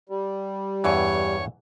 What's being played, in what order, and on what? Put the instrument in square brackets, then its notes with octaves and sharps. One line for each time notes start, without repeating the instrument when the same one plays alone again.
[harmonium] G3
[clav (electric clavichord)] E2 G2 E3 [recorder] C#5